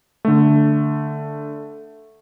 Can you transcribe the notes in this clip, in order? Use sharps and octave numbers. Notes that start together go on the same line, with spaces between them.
D3 A3